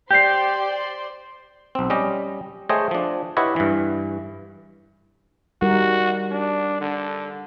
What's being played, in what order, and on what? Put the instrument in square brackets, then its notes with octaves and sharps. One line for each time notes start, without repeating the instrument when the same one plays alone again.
[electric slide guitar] G4 [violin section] C5 D5 C6 [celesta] G6 C7
[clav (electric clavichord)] B1 C4
G3 C#4 G4 D#5
A3 G#4 C5 C#5 D#5 G5
F3 D4
E4 G4 B4 C#5 D#5 F#5
G2 E3
[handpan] G3 D#4 A#4 [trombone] F#4
[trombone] D4
D3